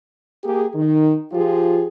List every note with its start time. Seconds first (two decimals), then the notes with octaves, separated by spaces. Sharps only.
0.44 A#3 G4 G#4
0.75 D#3
1.32 F3 F4 G4 G#4